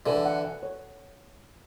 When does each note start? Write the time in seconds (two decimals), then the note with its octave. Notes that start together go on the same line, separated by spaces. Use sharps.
0.06 D3 E3 A4
0.25 F#5
0.44 F#5
0.63 C#5